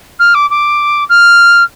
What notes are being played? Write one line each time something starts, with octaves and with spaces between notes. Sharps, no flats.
F6
D6
D6
F6